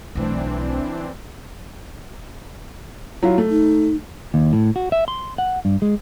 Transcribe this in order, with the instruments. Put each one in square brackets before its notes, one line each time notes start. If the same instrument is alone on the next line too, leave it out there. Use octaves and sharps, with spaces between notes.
[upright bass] B1 A3 [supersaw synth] E3 C4 D4
[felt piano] F#3 E4 F4
A3
[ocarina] D#4
[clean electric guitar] D#2
A2
F#4
E5
C6
F#5
G2
G#3